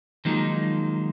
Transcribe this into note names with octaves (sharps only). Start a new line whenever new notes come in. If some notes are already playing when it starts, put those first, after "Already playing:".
D#3 F3 F#3 G#3 A#3 D#4